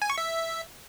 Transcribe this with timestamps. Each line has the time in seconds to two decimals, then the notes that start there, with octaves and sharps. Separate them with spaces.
0.02 G#5
0.10 C#6
0.18 E5